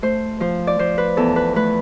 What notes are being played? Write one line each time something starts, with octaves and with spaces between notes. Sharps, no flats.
A3 C5
F3 C5
D5
F3 C5
B4
E2 A4
B4
A3 B4